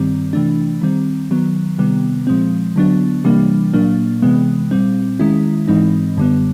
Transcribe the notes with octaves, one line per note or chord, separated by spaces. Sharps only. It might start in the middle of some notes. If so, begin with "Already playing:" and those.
Already playing: G2 D#3 G3 C4
C3 E3 A3 D4
D#3 G3 C4
D#3 F#3 B3
C3 D#3 G3 B3
A#2 F3 G#3 C4
D3 F#3 B3 D4
C3 E3 G3 A#3 D4
A#2 F#3 A#3 D4
C3 E3 G#3 B3
A#2 G3 C4
D#3 G#3 C#4 E4
G#2 E3 G#3 C4 D#4
F#2 D3 G3 B3